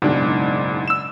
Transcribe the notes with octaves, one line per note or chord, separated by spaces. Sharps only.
F#1 B1 G#2 D4
E6 E7